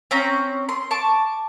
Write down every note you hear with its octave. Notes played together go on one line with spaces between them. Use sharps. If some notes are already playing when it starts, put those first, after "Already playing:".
C4 C#4 A#5
C6
A5 C#6 D6